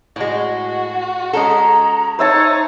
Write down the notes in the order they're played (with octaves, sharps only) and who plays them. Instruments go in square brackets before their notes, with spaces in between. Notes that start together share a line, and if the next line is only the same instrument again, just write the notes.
[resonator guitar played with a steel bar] A2 G#3 [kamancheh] F#4
[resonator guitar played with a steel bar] G#3 C#4 A4 [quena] A#5
[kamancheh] D#4 [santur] C5 E5 A5 [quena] C#5